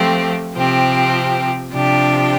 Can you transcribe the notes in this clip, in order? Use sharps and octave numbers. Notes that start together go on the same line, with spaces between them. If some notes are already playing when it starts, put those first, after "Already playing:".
Already playing: F3 A3 C4 G4
C3 F3 C4 G4
C3 F3 D4 G4